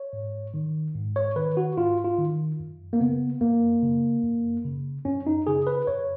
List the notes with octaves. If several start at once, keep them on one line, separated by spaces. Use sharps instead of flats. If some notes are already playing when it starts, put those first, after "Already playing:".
Already playing: C#5
G#2
D#3
G#2
C#5
D#3 B4
F#4
G#2 F4
F4
D#3
F#2
A#3
C#3 B3
F#2 A#3
C#3
F#2
C#3
F#2 C#4
D#4
C#3 G#4
B4
F#2 C#5